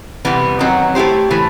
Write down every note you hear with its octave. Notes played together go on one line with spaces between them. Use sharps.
E2 C3 E3 G3 B3
F#2 D#3 F#3 C4 F#4
A3 E4 G4 C5
A2 E3 A3